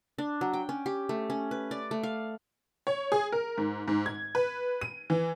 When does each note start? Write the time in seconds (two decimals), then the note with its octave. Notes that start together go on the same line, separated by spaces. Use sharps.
0.18 D4
0.41 F#3
0.53 G5
0.69 C#4
0.86 G4
1.09 A3
1.30 C#4
1.51 B4
1.71 D5
1.91 A3
2.03 F5
2.87 C#5
3.12 G#4
3.32 A#4
3.58 G#2
3.88 G#2
4.06 G#6
4.35 B4
4.81 D#7
5.10 E3